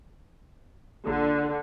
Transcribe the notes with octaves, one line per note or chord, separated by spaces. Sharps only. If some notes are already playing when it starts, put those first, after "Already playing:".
A#1 D3